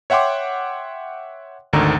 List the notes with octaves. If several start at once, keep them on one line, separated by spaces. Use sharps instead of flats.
C#5 E5 F#5 G5 C6 D6
G#1 D2 D3 D#3 A#5